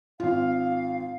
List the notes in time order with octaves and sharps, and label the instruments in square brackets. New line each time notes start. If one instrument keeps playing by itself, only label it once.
[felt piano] G#1 F4 [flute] F5